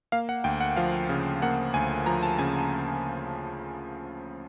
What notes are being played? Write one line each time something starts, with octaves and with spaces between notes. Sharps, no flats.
A#3 F5
F#5
D2 G5
F#5
F3 F5
C#3
A#3 F#5
D2 G#5
F3 A#5
A5
C#3 G#5